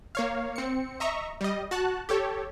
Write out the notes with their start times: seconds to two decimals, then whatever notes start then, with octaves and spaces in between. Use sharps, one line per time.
0.15 A#3 C#5 F5
0.56 C4 C#7
1.00 D#5 E5 A#5 C#6
1.41 G3 D#5
1.71 F#4 A5 F#6
2.09 G4 A4 C#5